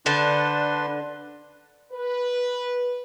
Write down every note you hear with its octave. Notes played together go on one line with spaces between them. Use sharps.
D3 D4 B4 C5 A5 C6
B4